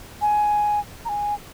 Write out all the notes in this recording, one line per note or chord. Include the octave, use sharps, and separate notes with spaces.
G#5
A#5
G#5